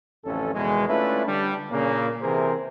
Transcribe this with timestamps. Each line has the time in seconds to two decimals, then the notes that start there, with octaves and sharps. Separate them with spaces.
0.24 A1 F2 D3 C#4 A4
0.54 E2 B2 D#3 G#3
0.88 A3 C#4 D4 E4 F4 B4
1.26 D3 G3 D4
1.71 A#2 C#3 A#3
2.22 C3 E3 G#4 A#4 C5